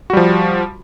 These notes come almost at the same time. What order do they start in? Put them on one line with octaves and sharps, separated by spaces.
F#4 G3 F3